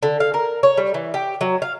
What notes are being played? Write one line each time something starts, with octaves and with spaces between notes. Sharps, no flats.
D3
F5
A#4
C#5
G3
E3
G4
F#3
F5